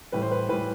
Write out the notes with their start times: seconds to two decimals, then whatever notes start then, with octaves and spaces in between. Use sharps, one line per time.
0.12 A2 E3 G3 B4
0.22 C5
0.31 B4
0.49 A2 E3 G3 B4